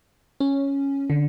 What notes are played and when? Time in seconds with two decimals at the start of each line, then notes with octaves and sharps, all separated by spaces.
0.40 C#4
1.10 D3